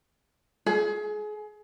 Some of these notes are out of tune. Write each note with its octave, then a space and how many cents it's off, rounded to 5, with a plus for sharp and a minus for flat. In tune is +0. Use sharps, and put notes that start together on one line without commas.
G#4 +30